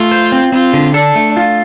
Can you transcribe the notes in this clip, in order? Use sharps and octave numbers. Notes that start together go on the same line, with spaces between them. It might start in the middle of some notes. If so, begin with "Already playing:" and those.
Already playing: A3 F4
C5
C4
C4 F4
D3
D4 A4
A3
F4